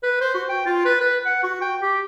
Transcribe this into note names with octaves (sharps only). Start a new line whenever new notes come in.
B4
C5
F#4
G5
F4
B4
B4
F#5
F#4
G5
G4